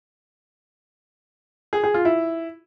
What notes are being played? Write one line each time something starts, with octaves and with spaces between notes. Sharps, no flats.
G#4
G#4
F4
E4